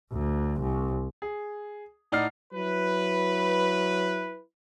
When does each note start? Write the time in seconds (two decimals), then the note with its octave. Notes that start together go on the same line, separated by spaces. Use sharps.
0.12 D2
0.60 C2
1.22 G#4
2.12 A2 D#4 D5 F#5 F6 C7
2.52 F#3 E4 B4